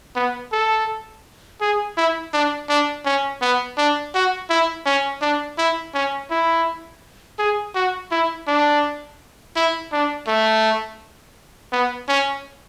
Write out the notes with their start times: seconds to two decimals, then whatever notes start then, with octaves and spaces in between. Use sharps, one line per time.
0.16 B3
0.52 A4
1.61 G#4
1.97 E4
2.33 D4
2.69 D4
3.05 C#4
3.41 B3
3.77 D4
4.14 F#4
4.49 E4
4.86 C#4
5.22 D4
5.58 E4
5.94 C#4
6.30 E4
7.39 G#4
7.75 F#4
8.11 E4
8.47 D4
9.56 E4
9.92 D4
10.27 A3
11.72 B3
12.08 C#4